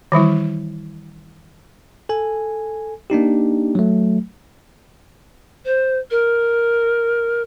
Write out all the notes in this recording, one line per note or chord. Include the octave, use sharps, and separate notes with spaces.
D#3 E3 G3 E4
A4 G#5
A#3 D4 D#4 G4
F#3 A3
C5
A#4